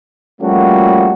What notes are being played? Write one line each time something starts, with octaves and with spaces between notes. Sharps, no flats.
F3 G3 A3 A#3 C#4 F#4